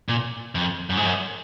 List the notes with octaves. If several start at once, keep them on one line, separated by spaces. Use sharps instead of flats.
A#2
F2
F#2
G#2
F#2